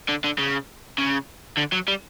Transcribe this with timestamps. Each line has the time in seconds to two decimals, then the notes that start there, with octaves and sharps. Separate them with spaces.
0.09 D3
0.24 D3
0.38 C#3
0.98 C#3
1.58 D3
1.73 F#3
1.88 G3